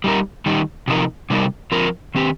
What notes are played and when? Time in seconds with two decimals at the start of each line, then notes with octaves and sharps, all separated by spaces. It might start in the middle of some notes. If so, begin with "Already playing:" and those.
0.04 G3 D#4 A#4
0.46 D#3 G3 D#4
0.88 C3 F3 D#4 A#4
1.30 C3 G3 D#4 A#4
1.72 F3 C4 F4 A#4
2.15 D#3 C4 G4